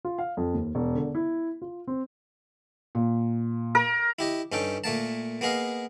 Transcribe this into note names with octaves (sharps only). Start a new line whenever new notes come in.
F4
F5
F2
D#2
E1
D3
E4
F4
C4
A#2
A#4
E4 G4 D#5
G2 C#4 D#4 A4 G5
A#2 A3 A#3 A5
A#3 B3 G#4 D#5 F5